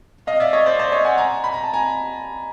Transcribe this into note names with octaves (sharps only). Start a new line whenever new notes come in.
D#5 F5
D5 E5
C#5 D#5
C5 D5
C5 D5
C#5 D#5
F#5 G#5
G#5 A#5
B5
A#5
A5
G#5 A#5